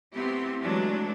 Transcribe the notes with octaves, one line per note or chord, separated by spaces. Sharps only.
A3 B3 C4 E4 G4
E3 F#3 G#3 A3 D4